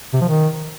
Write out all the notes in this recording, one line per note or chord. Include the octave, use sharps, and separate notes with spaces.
C3
F3
D#3